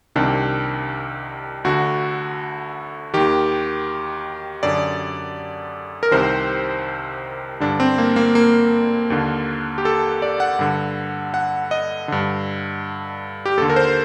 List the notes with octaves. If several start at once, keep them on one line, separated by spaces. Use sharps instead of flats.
C2 C3 D#3 D4
D2 D3 F#4
D#2 D#3 G4
F#2 D3 D5
A#4
C2 C3 D#3 C5
G2 D3 D4
C4
A#3
A#3
A#3
D#2 D3
G4
A4
D5
F#5
G2 D3
F#5
D#5
G2 D3
G4
D#2 D3 A4
A#4
C5